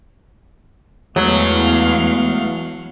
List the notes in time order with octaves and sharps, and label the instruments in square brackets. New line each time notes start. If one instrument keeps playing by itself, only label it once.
[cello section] E2 F5 [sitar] F#3 [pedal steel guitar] G#3 A3 B3